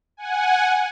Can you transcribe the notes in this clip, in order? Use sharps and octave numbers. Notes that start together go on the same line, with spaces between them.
F#5 G#5